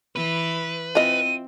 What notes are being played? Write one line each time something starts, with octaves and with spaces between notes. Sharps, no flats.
E3 B4
E3 C4 F4 D#5 D#7